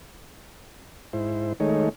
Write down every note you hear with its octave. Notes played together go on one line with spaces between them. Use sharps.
G#2 E4 C5
D#3 G#3 A3 D#4 C#5